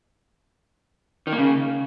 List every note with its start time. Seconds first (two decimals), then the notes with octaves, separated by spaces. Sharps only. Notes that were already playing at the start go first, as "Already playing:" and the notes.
1.27 D#3
1.33 A#3
1.38 C#3